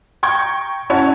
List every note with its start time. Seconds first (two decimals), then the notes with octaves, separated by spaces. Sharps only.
0.23 G5 A#5 C#6 G6 G#6
0.90 C#4 E4 F#4 C#5 F#5 A5